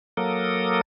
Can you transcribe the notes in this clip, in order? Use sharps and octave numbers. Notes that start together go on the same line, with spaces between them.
F#3 A#3 A4 A#4 D#6